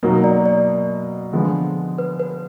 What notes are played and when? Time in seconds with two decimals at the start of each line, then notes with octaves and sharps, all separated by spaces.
0.03 B2 F#3 A#3 D#4 A#4
0.24 D5
0.46 D5
1.33 D3 F3 G#3 B3
1.98 B4
2.20 B4